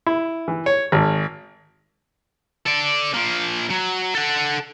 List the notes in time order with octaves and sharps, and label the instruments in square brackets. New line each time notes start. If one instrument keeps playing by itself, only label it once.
[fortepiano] E4
E3
C#5
G#1
[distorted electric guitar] A4 D5
F3 A#3
F#3
A4 F#5